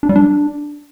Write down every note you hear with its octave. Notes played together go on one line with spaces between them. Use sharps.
D4
G3
D4